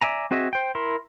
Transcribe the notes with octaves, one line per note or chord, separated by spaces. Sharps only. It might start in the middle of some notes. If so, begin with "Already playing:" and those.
D5 E5 G#5 A#5
C4 F#4 G#4 D#5 E5
C5 G5
E4 A#4 C6